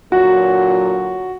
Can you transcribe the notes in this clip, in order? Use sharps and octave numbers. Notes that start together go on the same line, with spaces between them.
A#2 D3 F#3 F#4